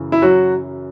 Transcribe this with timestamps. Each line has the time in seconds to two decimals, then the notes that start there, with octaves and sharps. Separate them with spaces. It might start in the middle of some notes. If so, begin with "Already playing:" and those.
Already playing: F#2 C#3 E3
0.12 E4
0.22 F#3 F#4